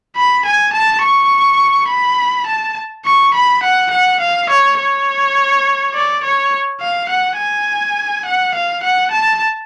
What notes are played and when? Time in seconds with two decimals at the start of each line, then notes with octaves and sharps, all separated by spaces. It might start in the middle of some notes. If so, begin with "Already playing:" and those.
0.16 B5
0.45 G#5
0.73 A5
1.02 C#6
1.89 B5
2.47 A5
3.06 C#6
3.34 B5
3.63 F#5
3.91 F#5
4.21 F5
4.50 C#5
4.79 C#5
5.94 D5
6.24 C#5
6.81 F5
7.09 F#5
7.38 G#5
8.26 F#5
8.55 F5
8.83 F#5
9.12 A5